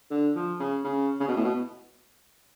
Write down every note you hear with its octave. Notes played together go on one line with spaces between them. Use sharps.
D3
F3
C#3
C#3
C#3
B2
A2
B2